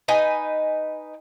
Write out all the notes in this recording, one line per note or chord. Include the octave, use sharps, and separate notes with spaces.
D#4 B4 G#5